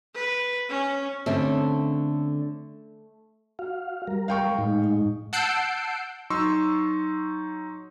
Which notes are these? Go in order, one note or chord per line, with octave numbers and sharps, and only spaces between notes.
B4
C#4
D3 A3 C4 C#4
F#4 F5
G3 A#4
F5 G5 C#6
A2 G#3 D#4
F#5 A5 E6 G6 C7 D7
F#3 D#4 C6 C#6 E6